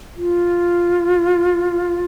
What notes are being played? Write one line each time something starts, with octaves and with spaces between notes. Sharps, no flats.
F4